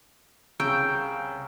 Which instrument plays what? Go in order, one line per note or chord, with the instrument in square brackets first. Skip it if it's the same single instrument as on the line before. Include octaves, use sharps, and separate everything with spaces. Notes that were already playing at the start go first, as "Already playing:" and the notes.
[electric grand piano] C2 C#3 F5 [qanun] G5 [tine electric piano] A#5 C#6 E6